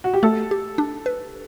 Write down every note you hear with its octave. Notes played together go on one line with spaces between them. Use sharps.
F#4
G4
A3 A4
G4
D4
B4